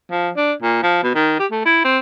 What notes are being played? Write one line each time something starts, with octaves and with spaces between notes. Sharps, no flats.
F3
D4
A#2
F3
B2
D#3
G4
A3
E4
C4